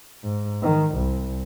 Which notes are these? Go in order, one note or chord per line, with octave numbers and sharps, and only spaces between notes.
G#2
D#3
C2